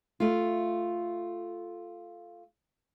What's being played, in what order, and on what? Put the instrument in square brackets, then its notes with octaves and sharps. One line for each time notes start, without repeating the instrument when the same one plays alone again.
[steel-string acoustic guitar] A3 F4